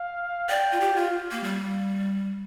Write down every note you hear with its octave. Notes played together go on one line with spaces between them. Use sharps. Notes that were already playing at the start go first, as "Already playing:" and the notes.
Already playing: F5
D5 G5
F4
G4
F4 F5
A#3
G3